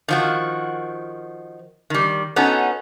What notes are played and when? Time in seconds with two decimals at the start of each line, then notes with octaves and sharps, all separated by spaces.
0.08 D#3 F3 F#4
1.90 D#3 G3
2.36 B3 C#4 D#4 F#4 A4